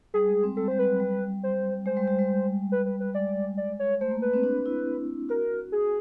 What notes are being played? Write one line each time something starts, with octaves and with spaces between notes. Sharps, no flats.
G3 G#4
G#3
C4
G3 A4
G3 C5
B4
F#3
G3
C5
G#3 C5
G3
G3
G3
B4
B4
B4
G#3 D5
D5
C#5
A3 C5
A#3
B4
C4
D4
E4
F#4 A#4
G#4